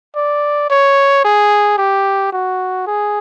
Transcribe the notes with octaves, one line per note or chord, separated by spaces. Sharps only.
D5
C#5
G#4
G4
F#4
G#4